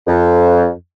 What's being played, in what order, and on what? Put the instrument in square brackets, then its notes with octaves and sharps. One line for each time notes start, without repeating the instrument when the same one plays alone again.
[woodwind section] F2